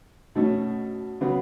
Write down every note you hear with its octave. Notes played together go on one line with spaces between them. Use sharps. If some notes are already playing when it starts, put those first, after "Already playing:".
B2 A3 C#4
C#3 F#3 B3